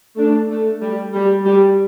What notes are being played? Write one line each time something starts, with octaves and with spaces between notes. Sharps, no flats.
A3 D4
A3
G3
G3
G3